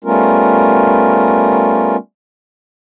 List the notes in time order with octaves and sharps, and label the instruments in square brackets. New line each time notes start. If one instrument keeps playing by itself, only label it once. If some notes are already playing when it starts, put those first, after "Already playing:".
[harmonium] G3 A3 B3 C#4 F4 A#4